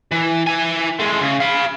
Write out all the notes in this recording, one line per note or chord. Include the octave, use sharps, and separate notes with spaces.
E3
E4 G#5
G#3 A3
C#3
F5 B5